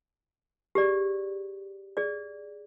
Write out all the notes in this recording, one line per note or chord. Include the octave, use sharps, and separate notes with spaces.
G4 G#4 D5
G#4 D5